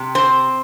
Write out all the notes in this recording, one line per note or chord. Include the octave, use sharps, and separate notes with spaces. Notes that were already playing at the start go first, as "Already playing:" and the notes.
Already playing: C3
C4 C5